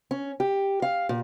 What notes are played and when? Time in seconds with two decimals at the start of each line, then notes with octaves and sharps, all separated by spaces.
0.11 C#4
0.40 G4
0.82 F5
1.09 A#2